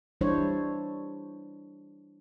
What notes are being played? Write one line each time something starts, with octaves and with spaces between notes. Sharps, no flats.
E3 G3 D4 E4 C5 C#5